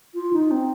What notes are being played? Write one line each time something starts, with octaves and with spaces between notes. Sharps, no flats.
F4
D#4
C4